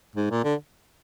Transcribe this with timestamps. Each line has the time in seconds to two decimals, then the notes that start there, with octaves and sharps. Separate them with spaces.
0.16 G#2
0.30 A#2
0.44 D3